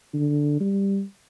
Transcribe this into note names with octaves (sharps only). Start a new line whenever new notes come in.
D3
G3